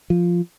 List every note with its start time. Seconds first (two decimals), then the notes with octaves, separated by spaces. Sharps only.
0.10 F3